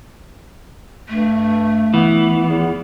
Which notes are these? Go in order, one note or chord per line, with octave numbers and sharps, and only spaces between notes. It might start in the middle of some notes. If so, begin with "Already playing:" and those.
G2 A3
E3 B3
E2